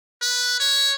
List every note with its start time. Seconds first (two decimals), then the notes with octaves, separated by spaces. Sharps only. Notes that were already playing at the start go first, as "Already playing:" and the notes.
0.21 B4
0.60 C#5